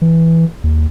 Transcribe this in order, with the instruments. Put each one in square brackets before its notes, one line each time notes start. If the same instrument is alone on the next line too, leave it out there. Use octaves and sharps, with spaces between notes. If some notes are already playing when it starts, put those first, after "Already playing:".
[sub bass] E3
D#2